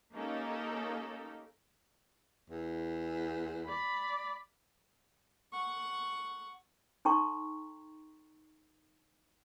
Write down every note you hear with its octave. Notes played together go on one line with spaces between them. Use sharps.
A#3 C#4 D#4 G4 A4 A#4
E2
D5 B5
F#5 C#6
D#4 A4 G5 A#5 C6 C#6